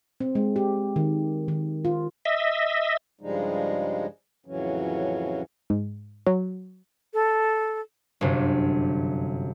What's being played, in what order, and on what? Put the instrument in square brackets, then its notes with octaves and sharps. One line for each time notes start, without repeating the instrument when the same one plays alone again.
[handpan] C4
G#3
G4
D#3
D#3
F4
[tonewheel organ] D#5 E5
[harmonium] G2 C#3 F3 G3 G#3 D#4
F2 A2 C#3 E3 F#3 C#4
[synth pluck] G#2
F#3
[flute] A4
[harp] G1 F#2 C3